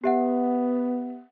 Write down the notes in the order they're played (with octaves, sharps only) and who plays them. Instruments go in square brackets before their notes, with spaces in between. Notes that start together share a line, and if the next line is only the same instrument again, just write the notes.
[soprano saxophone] B3 [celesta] G4 E5 F#5